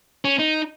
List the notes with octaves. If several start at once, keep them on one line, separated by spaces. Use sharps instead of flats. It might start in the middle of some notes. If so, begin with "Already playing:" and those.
C#4
D#4